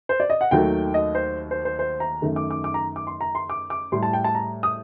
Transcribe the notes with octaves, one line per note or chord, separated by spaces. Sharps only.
C5
D5
D#5
F#5
D#2 D#3 F#3 A3 G5
D#5
C5
C5
C5
C5
A#5
F#2 D#3 A3
D6
D6
D6
A#5
D6
C6
A#5
C6
D6
D6
A2 G3 C6
A5
G5
A5
A#5
D#6